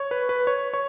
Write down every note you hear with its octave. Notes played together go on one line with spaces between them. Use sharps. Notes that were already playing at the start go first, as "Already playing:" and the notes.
Already playing: C#5
B4
B4
C#5
C#5